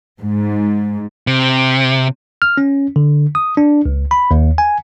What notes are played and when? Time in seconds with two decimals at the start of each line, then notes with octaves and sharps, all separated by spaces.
0.21 G#2
1.27 C3
2.42 F6
2.57 C#4
2.96 D3
3.35 D#6
3.57 D4
3.85 C#2
4.11 B5
4.31 D#2
4.58 G#5